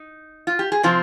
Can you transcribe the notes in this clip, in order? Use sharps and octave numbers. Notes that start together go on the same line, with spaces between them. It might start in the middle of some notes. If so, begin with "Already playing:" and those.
Already playing: D#4
F4
G4
G#4
C3 F3 C4 F4